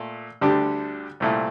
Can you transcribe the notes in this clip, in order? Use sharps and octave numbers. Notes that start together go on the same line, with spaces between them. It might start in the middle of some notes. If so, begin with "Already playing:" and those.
Already playing: A#2 A3
D2 D3 G3 D4 G4
C2 A#2 A3 E4